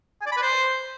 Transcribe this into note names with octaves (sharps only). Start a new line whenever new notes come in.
G#5
D5
B5
B4
C5